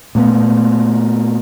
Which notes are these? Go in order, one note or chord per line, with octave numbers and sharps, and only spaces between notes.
A#2 A3 B3